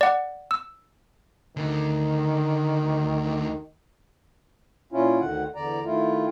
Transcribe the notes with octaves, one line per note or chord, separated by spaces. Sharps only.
D5 F#5
E6
D2 D3 D#3
A#2 C#4 E4 F4
D2 D3 D#3 F#5
E2 D3 D5 A#5
D#3 A3 E4 F4